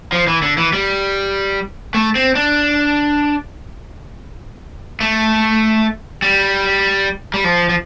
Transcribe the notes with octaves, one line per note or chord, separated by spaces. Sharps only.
F3
E3
D3
E3
G3
A3
C4
D4
A3
G3
G3
F3
F3